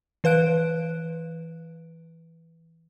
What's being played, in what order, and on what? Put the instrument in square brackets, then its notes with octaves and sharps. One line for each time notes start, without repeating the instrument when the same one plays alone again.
[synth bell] E3 B4 F5 F#6 D7